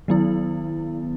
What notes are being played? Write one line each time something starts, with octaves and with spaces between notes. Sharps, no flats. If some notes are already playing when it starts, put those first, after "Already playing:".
D#3 F#3 B3 E4